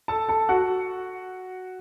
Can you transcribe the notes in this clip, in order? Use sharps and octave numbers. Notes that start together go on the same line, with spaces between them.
A4 A5
A4 A5
F#4 F#5